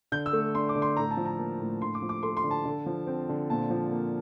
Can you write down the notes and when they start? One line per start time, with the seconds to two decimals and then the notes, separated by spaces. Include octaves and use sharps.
0.12 D3 G6
0.26 E6
0.33 A3
0.55 D4 C6
0.69 D6
0.75 D3
0.82 C6
0.96 A2 A#5
1.11 A5
1.17 F3
1.25 A#5
1.38 A#3
1.60 A2
1.82 D3 C6
1.95 D6
2.02 F3
2.09 D6
2.23 A3 C6
2.37 C6
2.44 D3
2.51 A5
2.65 D3
2.86 F3
3.07 C4
3.29 D3
3.50 A#2 A5
3.70 F3
3.92 A#3